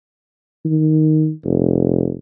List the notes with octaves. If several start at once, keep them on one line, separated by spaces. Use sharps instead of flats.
D#3
F1